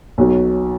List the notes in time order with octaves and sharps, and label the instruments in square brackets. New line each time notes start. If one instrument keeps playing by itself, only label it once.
[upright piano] B1 B2 F#3